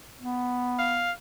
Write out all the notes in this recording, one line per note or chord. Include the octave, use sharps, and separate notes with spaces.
B3
F5